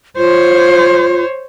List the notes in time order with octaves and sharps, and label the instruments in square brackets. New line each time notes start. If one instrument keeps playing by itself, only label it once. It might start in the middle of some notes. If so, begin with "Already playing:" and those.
[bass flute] F4 [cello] C5 C#5